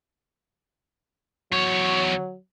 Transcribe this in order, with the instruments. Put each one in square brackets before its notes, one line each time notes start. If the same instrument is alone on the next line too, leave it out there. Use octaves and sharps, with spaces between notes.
[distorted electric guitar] E2 C#5 [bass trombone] F#3